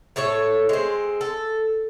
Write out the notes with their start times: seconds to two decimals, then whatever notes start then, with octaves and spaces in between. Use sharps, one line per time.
0.16 A2 A3 A4 C#5
0.69 G#3 C4
1.21 A4